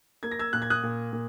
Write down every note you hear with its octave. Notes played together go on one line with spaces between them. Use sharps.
A#3 G#6
A#6
E6 G#6
A#2 F#6
G#6
D#6 F#6
A#2
A#2